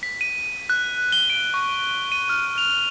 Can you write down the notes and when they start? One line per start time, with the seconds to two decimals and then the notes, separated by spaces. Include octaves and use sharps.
0.03 B6
0.21 D#7
0.70 F#6
1.12 G7
1.30 D7
1.54 C#6
2.12 D#7
2.29 F6
2.58 F7